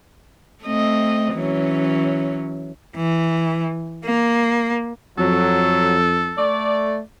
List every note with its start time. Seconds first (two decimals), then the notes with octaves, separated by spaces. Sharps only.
0.65 A3 C4 D#5
1.33 E3 F#3 C#4
2.95 E3
4.05 A#3
5.18 F2 F#3 A4
6.38 A3 D5